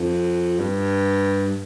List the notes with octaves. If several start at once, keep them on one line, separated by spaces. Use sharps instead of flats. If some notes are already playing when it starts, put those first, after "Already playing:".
Already playing: F2
G2